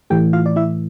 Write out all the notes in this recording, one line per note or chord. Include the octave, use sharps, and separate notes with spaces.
A2 E3 A3 G4 G5
F4 F5
D5
E4 E5